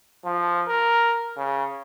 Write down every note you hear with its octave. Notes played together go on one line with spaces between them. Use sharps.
F3
A#4
C#3